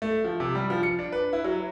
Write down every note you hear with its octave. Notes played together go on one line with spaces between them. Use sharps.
A3
F3
C3
G3
F3
C#7
D4
B4
E4
F#3